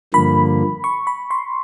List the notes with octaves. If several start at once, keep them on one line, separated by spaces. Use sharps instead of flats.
G2 D3 F3 A#3 B5
C#6
B5
C6